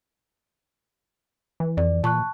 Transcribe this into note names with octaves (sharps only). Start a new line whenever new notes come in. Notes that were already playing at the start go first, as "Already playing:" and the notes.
E3
F2 D5
A#2 A5 C#6 F#6